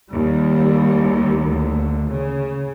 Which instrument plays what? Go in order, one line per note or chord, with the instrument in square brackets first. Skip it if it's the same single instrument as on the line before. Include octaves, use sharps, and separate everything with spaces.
[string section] D#2 [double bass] G3
[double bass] D2
C#3